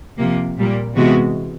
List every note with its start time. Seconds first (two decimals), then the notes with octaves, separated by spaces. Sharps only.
0.18 C3 F3 A#3
0.57 A#2 G3 A#3
0.96 C3 E3 G#3 B3 F#4